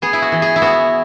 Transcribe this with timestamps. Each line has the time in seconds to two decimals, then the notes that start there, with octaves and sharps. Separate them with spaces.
0.02 B3 G#4
0.13 E4
0.22 F#4
0.32 E3
0.42 G#4
0.56 E4
0.62 B3 F#4